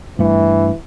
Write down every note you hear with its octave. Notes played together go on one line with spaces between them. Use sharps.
G2 E3 A3